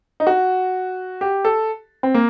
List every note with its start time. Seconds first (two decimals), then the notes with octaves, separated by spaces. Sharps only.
0.20 D#4
0.27 F#4
1.21 G4
1.45 A4
2.03 C4
2.14 A#3